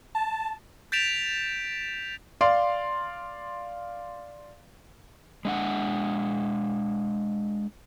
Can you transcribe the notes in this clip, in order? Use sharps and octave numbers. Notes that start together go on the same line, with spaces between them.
A5
G6 A6 B6 D7 E7 F7
D5 F5 C6
G#3 D4 F#5